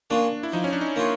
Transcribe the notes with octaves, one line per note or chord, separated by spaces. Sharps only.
A#3 C#4 D4 F4
E4
F3 D#4
C#4
D4
D#4
A#3 C#4 F4